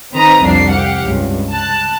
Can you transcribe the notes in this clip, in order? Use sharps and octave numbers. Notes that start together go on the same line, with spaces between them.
D#3 C4 B4 A#5 D#6
C2 F2 A#3 D4 C7
G4 F5 F#5
C#2 G2
A5 F#6